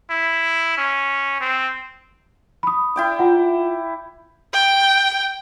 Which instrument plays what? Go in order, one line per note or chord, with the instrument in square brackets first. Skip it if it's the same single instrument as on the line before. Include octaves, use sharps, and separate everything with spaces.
[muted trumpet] E4
C#4
C4
[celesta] B5 D#6
[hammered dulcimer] E4 G5 D6
[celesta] F4 F#5
[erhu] G5